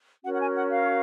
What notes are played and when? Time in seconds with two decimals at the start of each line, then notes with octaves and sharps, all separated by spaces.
0.24 C#4 F#4 A#4 C#5 F#5
0.35 F#5
0.40 G#5
0.54 F#5
0.70 F5